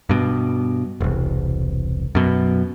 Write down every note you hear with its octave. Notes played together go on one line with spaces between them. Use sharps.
G2 B2
E1 C2
F#2 B2